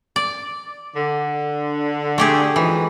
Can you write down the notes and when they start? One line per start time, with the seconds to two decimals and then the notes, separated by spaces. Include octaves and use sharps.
0.16 D5
0.96 D3
2.18 A3 G4 G#4
2.56 E3 F3 G#3 D#4